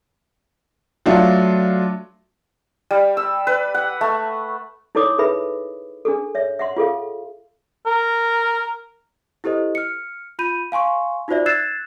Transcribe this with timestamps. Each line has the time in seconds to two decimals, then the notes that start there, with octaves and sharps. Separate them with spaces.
1.06 F#3 A3 D4 F4
2.91 G3
3.17 E6
3.47 B4
3.74 F#5
4.01 A3
4.95 D#4 E4 A4 C#5 D6 D#6
5.18 D#4 G#4 A4 B4 E5 B5
6.05 D4 G#4 A4
6.35 C#5 E5
6.59 E5 F#5 C6
6.76 F4 G#4 A4 F5
7.86 A#4
9.44 E4 G4 A4 C5 D#5
9.75 F6 C#7
10.39 F4 B5 G6 D#7
10.72 F5 G#5 C6 C#6
11.28 D#4 F4 F#4 C5 D5 E5
11.46 E6 F#6 G#6 A6 C7 E7